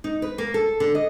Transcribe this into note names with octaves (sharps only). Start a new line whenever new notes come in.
D#4
B4
A#3
A4
D3
D#5